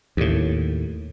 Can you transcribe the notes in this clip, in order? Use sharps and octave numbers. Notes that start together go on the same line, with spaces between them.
D#2 A2